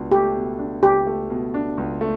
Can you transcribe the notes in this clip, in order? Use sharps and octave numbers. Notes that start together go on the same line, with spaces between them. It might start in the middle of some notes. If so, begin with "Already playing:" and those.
Already playing: C#2 B2 D4
A3 G4
B2
D4
C#2 G4
A3
B2
D4
C#2
A3